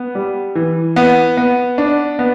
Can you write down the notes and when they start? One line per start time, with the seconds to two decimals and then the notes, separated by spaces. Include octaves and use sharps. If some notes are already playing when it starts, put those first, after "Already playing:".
Already playing: B3
0.15 G3
0.55 E3
0.96 B3
1.37 B3
1.78 D4
2.19 B3